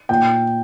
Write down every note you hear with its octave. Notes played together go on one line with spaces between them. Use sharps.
A#2 G5